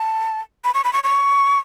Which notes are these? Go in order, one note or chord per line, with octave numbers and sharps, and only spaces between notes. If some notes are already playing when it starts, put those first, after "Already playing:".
Already playing: A5
B5
C#6
B5
C#6
C#6